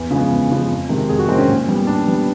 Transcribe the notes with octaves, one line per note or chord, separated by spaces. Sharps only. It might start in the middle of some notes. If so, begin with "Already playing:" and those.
Already playing: E2
C#3 F3 G#3 B3
E2
C#3 F3 G#3 B3
F2
C3 D#3 G#3 C4
F2 G#4
F#4
C3 D#3 G#3 C4
C#4
A#2
G3 B3
A#2 D4
G3 B3